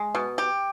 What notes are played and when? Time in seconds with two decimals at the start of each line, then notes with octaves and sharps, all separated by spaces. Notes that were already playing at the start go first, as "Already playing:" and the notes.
Already playing: G#3
0.15 B2
0.38 G4